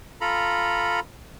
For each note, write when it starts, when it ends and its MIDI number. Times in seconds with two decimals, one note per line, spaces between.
0.21 1.00 65
0.21 1.00 69
0.21 1.00 82
0.21 1.00 83